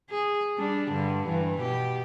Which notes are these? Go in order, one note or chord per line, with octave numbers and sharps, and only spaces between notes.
G#4
G3 D4
G2 D3
G2 E3
B2 G4